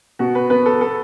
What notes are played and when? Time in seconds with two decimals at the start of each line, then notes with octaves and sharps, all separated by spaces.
0.19 B2 F#4
0.35 B4
0.50 B3 B4
0.66 A4
0.81 A4